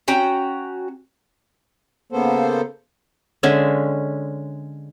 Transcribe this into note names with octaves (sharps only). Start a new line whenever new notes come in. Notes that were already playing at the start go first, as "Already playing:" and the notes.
C#4 F#4 G5 A#5
C#3 A#3 B3 A4 C5
D3 G#3 C#4 E5